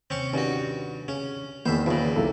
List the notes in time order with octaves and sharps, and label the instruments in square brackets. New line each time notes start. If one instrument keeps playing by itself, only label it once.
[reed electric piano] D#2 C3 [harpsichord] C4 C#4 C#6
[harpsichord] G2 F#4 [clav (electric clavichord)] D#3 C#4
[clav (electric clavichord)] C#3 [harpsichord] C#4
[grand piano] E2 D#3 [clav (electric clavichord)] E3 B3 [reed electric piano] A#3 [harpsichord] C5 E5
[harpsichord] C#2 A#2 [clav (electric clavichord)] F3 B3 E5
[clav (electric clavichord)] B1 A#3 E5 [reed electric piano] E4 A4